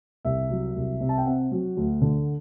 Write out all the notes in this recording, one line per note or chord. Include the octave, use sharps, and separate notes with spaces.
C2 E5
F#3
C2
C3
A5
G5
C4 F#5
F#3
D2
D3